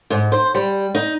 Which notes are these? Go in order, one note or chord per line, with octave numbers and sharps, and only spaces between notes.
G#2
C5
G3
D#4